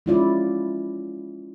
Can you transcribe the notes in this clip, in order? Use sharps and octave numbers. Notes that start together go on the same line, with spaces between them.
G#3 C#4 E4 F4 D5